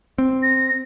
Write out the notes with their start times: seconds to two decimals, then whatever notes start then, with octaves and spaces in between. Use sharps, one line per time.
0.18 C4
0.43 A#6